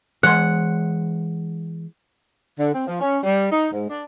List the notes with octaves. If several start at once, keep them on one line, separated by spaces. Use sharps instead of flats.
E3 G#3 F#5 C6
D3
C4
F3
C#4
G3
D#4
G#2
D4